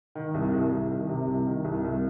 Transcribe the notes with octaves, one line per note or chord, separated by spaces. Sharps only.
D#3
C2
C2
C2
D#3
C3
C2
D#3
C2
C2